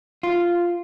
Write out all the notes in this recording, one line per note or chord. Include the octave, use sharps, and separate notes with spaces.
F4